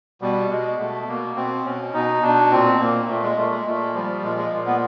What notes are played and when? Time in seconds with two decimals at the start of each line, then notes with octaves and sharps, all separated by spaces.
0.21 B2 G3
0.50 B2 G#3
0.79 B2 A3
1.08 B2 A#3
1.36 B2 C4
1.65 B2 C#4
1.93 B2 D#4
2.22 B2 D4
2.51 A#2 C4
2.79 A#2 A#3
3.08 A#2 A3
3.23 G#3
3.37 A#2 A3
3.51 G#3
3.65 A#2 A3
3.94 F3 G3
4.23 A#2 G#3
4.37 G#3
4.52 A#2
4.66 B3